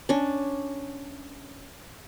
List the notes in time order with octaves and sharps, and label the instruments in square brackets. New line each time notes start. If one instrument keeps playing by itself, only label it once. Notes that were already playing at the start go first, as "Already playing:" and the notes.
[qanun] C#4 D4